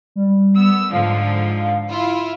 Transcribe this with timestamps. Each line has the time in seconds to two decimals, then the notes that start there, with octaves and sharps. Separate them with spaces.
0.16 G3
0.55 B3 E6
0.92 G#2 D3 F3 F5
1.89 E4 F4